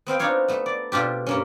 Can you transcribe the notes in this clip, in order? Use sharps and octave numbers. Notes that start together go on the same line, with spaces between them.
B3 C4 F5 G5
D4 D#4 F4 C#5 F5
A3 B3
D5
B2 D4 F4 G4
G2 A#3 C#4